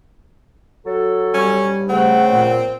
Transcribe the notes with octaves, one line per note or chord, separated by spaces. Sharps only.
F#3 A4
G3 C#4
C#3 A3 C4 F#5
A#2